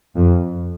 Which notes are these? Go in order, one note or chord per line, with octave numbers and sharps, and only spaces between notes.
F2